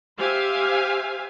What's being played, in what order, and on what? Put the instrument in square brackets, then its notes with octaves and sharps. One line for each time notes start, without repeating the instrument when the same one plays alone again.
[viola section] G4 C5 E5 F5 G#5